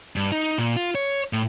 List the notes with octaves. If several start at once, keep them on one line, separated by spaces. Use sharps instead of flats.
G2
D#4
A#2
F4
C#5
A2